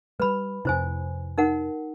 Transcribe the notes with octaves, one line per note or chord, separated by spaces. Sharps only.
G3 G#3 B4 B5
F2 C3 E4 C5 G#5
D#4 A#4 F#5